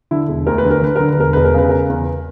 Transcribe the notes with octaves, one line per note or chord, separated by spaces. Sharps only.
D3 E4
E1
D2 A#4
B4
D3
A#4
D3 B4
D3 A#4
B4
E1 A#4
E1 B4
A#4
C#3 B4
C#3 A#4
E2